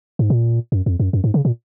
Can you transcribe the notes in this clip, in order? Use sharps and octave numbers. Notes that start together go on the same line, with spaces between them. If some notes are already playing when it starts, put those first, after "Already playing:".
G#2
A#2
F#2
F2
F#2
F#2
G#2
C#3
A#2